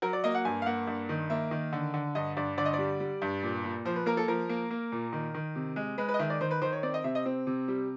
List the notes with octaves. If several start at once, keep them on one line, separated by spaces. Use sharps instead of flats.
F#3 A#4
D5
A#3 D#5
F#5
G2 G#5
F5
A#3 F#5
G2
D#3
A#3 E5
D#3
D3
D3
G2 D#5
G2 D5
D3 D5
D#5
G3 D5
G3
G2
A#2
A#2
F3 C5
B4
A#3 A#4
A4
F3 A#4
A#3
A#3
A#2
D#3
D#3
C3
G#3
G#3 B4
B4
D#5
D#3 E5
D5
D#3 C5
B4
D#3 C5
C#5
C4 D5
D#5
C3 E5
D#5
C4
C3
G3